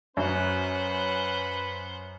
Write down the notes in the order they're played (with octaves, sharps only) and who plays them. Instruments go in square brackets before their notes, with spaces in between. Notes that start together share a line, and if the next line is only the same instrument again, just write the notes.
[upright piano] F#2 [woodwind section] C#4 [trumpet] B4 [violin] C5 F#5